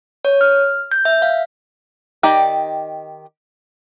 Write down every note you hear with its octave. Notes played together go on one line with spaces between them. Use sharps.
C#5
F6
G6
E5
F5
D#3 D#4 G4 D5 G5